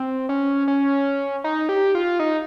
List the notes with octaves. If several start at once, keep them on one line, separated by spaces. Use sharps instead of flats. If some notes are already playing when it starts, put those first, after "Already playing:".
Already playing: C4
C#4
C#4
D#4
G4
F4
D#4